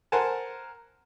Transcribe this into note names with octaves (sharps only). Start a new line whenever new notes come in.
A#4 C5 F#5 G#5 A5